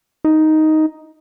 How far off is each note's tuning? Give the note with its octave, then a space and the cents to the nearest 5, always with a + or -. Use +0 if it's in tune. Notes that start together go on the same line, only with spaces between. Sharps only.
D#4 +5